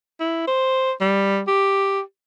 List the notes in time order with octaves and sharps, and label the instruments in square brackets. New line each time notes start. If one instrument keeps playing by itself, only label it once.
[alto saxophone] E4
C5
G3
G4